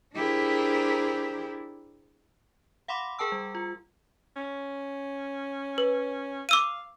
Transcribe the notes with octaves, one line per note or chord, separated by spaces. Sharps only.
D4 E4 G4 G#4 A#4 C5
F5 F#5 B5 C6 D6
G#4 A#4 G5 A5 E6
G3
F4
C#4
B4
F5 D6 E6 D#7